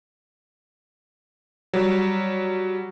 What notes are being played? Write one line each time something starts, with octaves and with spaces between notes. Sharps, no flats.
F#3 G3